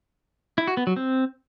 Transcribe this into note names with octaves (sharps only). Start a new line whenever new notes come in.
E4
F#4
B3
F#3
C4